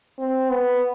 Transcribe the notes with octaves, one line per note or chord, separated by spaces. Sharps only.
C4
B3